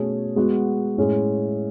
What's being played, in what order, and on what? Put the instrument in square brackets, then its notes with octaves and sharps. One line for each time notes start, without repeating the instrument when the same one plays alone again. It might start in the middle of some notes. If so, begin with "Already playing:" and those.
Already playing: [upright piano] B2 A3 C#4 G#4
G#3 B3 F#4
A2 G#3 C#4 G#4